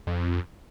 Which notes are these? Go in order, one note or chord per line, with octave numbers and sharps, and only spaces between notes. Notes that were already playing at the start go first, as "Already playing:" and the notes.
F2